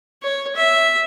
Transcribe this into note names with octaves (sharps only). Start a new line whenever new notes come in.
C#5
E5